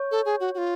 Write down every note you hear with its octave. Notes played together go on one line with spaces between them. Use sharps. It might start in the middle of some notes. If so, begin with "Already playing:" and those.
Already playing: C#5
A4
G#4
F#4
F#4
F4